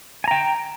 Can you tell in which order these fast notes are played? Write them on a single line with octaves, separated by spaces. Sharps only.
G#5 A#5 G5